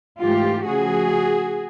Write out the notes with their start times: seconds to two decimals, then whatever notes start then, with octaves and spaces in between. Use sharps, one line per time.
0.21 G#2 E3 A3 F4 G4
0.66 C#3 F3 A3 F#4 G#4